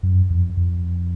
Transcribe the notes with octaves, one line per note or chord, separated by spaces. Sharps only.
F#2
F2
F2